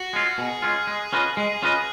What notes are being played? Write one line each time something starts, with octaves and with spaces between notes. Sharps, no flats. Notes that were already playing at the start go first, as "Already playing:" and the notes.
Already playing: F#4
G#3 C#4 F4
B2 G#4
G#3 C#4 F4
G#3
C#4 F4 B4 D#5
G#3 G#4
C#4 F4 B4 D#5